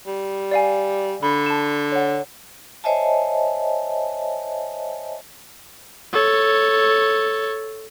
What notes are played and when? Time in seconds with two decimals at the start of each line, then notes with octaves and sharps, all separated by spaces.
0.07 G3
0.51 D5 F5 G#5
1.23 D3 B5
1.46 A5 E7
1.92 C#5 F#5
2.84 C5 C#5 D#5 E5 G#5 A5
6.13 A4 C#5